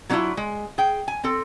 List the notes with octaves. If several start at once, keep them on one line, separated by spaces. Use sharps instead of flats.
F#3 A#3 C#4 D4 E4 F4
G#3
G#4 G5
G#5
C4 A4